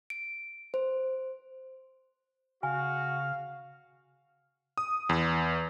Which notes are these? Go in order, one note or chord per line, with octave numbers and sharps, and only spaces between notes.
D7
C5
C#3 F#4 F5 G#5
D#6
E2